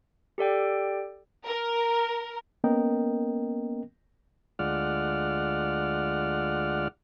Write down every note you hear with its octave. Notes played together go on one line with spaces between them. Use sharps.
G4 A4 D5 G5
A#4
A#3 B3 C#4 A#4 D#5 G5
D2 G#3 F4 D5 F#5 F6